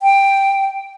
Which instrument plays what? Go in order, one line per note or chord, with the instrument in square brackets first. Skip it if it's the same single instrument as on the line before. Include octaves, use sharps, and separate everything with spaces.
[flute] G5